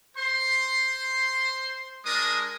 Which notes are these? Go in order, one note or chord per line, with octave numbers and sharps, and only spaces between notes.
C5 C6
G#3 D4 A#4 D#6